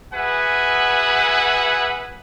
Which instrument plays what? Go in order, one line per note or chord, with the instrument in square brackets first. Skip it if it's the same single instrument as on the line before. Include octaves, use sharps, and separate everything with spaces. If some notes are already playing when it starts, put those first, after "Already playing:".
[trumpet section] F#4 G#4 B4 E5 F#5 G#5